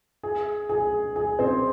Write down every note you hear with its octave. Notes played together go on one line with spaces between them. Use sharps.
G#4
G#4
G#4
C4 C5